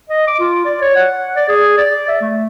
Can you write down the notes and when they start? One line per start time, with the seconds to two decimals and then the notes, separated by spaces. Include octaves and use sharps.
0.09 D#5
0.27 D6
0.40 F4
0.65 D5
0.81 C#5
0.96 F#5
1.36 D5
1.49 G#4
1.78 D5
2.08 E5
2.21 A3